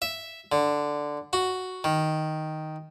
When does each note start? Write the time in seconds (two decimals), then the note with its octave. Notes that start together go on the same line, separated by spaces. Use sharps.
0.02 E5
0.52 D3
1.33 F#4
1.84 D#3